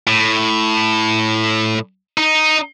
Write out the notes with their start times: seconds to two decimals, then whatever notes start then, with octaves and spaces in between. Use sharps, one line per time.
0.07 A2
2.18 D#4